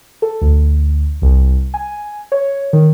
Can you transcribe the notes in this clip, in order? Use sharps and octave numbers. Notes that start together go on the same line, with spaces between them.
A4
D2
C2
G#5
C#5
D#3